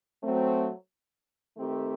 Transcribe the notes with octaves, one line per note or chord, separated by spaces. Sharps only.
F#3 A3 C4
D#3 A3 C4 G4